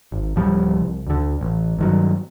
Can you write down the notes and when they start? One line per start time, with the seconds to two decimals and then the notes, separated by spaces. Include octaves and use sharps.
0.12 G#1
0.36 D1 F3 G3
0.81 C2
1.07 D2 D3
1.41 A1
1.79 G2 D#3 F#3